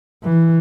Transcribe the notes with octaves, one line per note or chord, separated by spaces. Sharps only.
E3